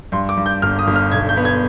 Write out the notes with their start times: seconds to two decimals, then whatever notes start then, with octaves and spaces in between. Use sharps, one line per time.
0.12 G2 C6
0.29 D6
0.37 G2
0.46 G6
0.62 G1 F6
0.79 D#6
0.87 G1
0.96 F6
1.12 B1 G#6
1.29 G6
1.37 B3
1.45 G#6